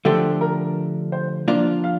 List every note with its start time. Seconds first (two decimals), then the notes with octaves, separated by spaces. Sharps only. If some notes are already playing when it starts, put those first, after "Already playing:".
0.05 D3 F3 A3 D4 G4 A4
0.41 A#4
1.12 C5
1.48 F3 A#3 D4 F4 D5
1.84 F5